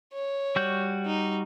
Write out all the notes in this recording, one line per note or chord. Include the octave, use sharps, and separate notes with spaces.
C#5
G3 F#4 G6
D#4